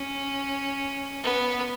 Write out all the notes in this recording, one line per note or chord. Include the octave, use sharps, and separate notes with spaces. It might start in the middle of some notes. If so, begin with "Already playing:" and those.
Already playing: C#4
B3